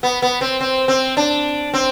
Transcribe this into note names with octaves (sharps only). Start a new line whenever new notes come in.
B3
B3
C4
C4
C4
D4
C4